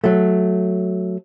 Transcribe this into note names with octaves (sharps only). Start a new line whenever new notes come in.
F#3 A3